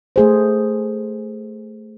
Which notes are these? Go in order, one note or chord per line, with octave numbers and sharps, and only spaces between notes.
A3 G#4 C5